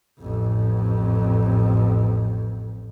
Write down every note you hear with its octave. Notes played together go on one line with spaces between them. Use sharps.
A1 F2